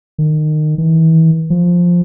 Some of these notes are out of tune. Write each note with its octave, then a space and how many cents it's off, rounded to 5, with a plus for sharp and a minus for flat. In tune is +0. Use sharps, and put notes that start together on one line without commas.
D#3 -25
E3 -35
F3 +5